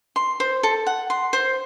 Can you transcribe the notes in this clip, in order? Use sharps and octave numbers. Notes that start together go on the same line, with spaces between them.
C6
C5
A4
F#5
C6
C5